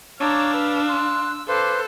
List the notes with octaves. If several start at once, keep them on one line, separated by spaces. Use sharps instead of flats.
D4 C#5 F5 A5 A#5 D6 E6
B4 E6
C6 F#6
A4 B4 C5 F5 C6 D6